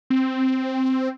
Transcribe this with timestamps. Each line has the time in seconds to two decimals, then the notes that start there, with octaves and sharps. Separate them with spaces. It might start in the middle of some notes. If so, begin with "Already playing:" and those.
0.10 C4